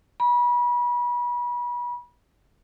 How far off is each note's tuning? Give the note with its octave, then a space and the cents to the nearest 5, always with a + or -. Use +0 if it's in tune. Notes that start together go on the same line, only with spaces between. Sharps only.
B5 -35